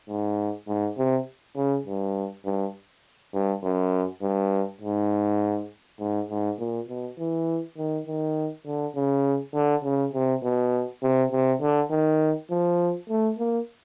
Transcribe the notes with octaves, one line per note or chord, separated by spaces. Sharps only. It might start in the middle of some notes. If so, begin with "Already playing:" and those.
G#2
G#2
C3
C#3
G2
G2
G2
F#2
G2
G#2
G#2
G#2
A#2
B2
E3
D#3
D#3
D3
C#3
D3
C#3
C3
B2
C3
C3
D3
D#3
F3
A3
A#3